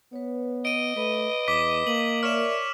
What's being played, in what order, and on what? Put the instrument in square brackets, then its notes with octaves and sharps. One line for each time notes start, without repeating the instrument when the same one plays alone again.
[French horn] B3 [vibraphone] B4 C#5
[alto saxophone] D#5 [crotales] D7 D#7
[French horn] A3 [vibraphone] B4 B5
[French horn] E2 [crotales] D6 B6
[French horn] A#3 [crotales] F#7
[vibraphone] A#4 D5 E5 [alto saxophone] C#5 [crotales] F6 E7